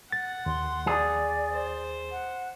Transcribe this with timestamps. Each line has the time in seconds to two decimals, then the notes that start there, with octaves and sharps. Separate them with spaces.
0.12 F#5 A6
0.46 D#2 C6
0.87 G#4 D5
1.53 C5
2.11 F#5